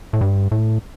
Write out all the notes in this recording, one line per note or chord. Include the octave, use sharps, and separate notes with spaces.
A2
G2
A2